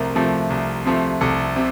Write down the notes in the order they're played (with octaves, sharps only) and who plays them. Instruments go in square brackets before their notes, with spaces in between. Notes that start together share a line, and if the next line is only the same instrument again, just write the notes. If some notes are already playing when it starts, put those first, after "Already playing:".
Already playing: [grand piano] C2 C3 F3 A3 A#4
C3 F3 A3
C2
C3 F3 A3
C2 A4
C3